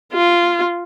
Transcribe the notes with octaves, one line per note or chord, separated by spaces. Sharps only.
F4